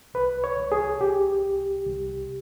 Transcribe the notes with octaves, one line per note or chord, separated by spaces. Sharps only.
C2 B4
C#5
C2
G#4
C2 G4
C2
C2